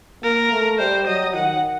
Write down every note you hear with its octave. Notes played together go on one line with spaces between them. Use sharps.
A#3 A#4
A3
G3 C5
F#3 D#5
D#3 F#5